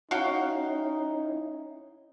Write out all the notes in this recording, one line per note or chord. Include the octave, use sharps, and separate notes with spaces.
C#4 D#4 E4 F#4 F5 G5